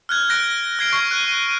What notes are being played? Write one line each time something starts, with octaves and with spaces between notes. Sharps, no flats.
F6 F#6 G#6
F#6 A#6 D7
F6 G#6 C7 D7
C#6 C7
F#6 D#7